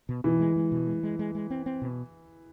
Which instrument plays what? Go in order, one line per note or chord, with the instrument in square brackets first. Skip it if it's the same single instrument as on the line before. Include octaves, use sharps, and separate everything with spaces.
[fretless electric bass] B2
[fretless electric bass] B2 [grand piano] E3
[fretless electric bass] G#3
G#3
B2
G#3
G#3
G#3
G#3
C4
C4
B2